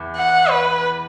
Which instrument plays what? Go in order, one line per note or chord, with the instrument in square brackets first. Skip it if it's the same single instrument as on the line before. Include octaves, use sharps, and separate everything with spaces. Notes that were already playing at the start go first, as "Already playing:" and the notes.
Already playing: [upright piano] E2 E3
[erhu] F#5
B4